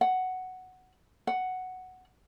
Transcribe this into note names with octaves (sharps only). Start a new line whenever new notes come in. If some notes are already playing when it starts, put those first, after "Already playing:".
F#5
F#5